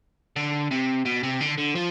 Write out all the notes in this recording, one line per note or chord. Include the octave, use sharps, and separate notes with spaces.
D3
C3
B2
C3
D3
D3
F3